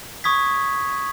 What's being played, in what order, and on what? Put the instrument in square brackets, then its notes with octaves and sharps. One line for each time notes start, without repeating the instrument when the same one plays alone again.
[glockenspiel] C#6 D#6 G#6 B6